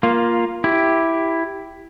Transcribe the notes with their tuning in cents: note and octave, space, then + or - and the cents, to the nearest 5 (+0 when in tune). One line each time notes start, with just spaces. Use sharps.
A#3 +10 F4 +0
E4 +0 G4 +0